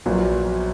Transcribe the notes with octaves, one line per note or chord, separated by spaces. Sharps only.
A#1 A#2 F#3 B3